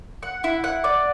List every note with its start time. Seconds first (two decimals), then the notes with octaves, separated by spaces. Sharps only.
0.23 F#5
0.44 E4
0.64 F#5
0.84 D5